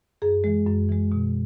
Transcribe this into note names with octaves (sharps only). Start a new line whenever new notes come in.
F#2 G#4
E3 G#3
F#2
E3 G#3
B2